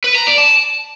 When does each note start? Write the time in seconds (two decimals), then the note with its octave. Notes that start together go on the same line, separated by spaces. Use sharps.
0.04 B4
0.15 A#5
0.27 D5
0.38 A5